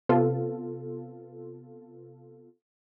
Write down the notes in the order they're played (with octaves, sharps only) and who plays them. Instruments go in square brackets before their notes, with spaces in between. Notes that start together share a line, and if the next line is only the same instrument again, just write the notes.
[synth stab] C3 B3 F4 A4